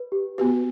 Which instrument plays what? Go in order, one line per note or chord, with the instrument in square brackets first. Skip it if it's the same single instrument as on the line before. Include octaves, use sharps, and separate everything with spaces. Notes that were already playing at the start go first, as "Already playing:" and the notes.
Already playing: [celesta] B4
G4
[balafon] B3 F#4 B4 [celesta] G4